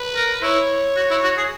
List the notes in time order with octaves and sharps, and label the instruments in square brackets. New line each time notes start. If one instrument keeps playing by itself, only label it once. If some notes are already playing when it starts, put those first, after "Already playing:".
Already playing: [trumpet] B4
[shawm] A#4
[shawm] E4 [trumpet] C#5
[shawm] F#4
E4
F#4
G#4